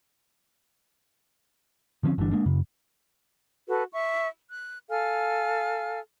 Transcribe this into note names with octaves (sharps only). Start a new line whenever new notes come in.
D3 F3 C4 C#4
G1 E3 G3 D4
G#3 A#3 D4
F#2 C#3
F#4 A4 B4
E5 C#6
F#6
A4 F5 G#5 F6